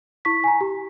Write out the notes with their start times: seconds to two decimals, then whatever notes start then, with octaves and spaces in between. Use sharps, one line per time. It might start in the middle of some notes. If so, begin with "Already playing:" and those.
0.25 E4 C#6 B6
0.44 G#5 A#5
0.61 G4